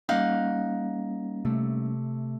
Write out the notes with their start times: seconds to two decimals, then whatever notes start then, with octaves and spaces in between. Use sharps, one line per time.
0.09 G3 A#3 C#4 D#4 F5 F#5
1.45 C3 A3